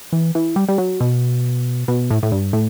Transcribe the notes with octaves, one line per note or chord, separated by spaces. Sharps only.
E3
E3
G3
G3
F#3
B2
B2
A2
A2
G2
A2